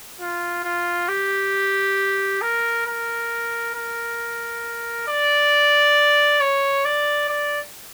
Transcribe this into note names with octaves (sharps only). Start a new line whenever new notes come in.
F4
F4
G4
A#4
A#4
A#4
D5
C#5
D5
D5